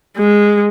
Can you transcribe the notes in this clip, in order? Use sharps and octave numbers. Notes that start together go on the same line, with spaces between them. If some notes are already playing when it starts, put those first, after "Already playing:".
G#3